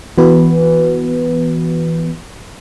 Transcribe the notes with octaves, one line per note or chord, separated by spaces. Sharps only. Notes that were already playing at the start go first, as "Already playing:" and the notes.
E3 B3 F#4 B4